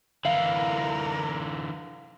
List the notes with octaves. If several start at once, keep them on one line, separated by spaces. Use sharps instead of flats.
D3 E3 A#4 F5